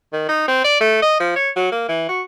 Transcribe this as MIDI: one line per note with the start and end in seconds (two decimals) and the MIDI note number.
0.13 0.28 51
0.29 0.45 63
0.48 0.62 60
0.64 0.77 74
0.81 0.98 57
1.02 1.17 75
1.20 1.35 53
1.36 1.50 73
1.56 1.69 54
1.72 1.86 58
1.89 2.05 52
2.09 2.22 66